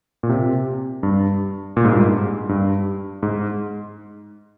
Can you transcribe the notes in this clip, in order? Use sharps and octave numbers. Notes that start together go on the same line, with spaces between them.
A#2
C3
G2
A#2
G#2
G2
G#2
G2
G#2